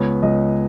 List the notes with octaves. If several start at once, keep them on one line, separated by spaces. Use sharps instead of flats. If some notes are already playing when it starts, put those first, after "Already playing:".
Already playing: C#2 B3 C#5
C#2 D#5